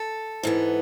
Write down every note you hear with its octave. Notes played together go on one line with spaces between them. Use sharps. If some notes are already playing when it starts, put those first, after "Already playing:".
Already playing: A4
G#2 E3 B3